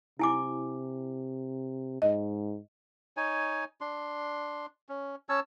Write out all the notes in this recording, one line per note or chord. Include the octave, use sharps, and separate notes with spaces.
C3 E4 G#5 D6
G#2 D#5
D#4 C#5 G#5
D4 C6
C#4
C#4 C#5 A5 E6